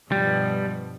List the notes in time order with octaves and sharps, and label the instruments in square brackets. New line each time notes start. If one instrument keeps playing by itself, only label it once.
[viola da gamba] G2 B2 F3 [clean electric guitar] G3